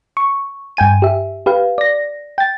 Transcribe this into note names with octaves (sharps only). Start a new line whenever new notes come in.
C#6
G2 G5 G#5 D#7
G4 E5
G4 B4 F5
D5 A#6
G5 A6